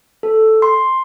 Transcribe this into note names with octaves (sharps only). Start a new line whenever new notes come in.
A4
C6